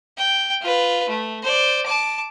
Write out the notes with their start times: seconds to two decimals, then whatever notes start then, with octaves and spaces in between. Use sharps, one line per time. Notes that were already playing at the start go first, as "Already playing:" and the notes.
0.17 G5
0.62 F4 B4
1.08 A3
1.43 C5 D5
1.86 A5 D6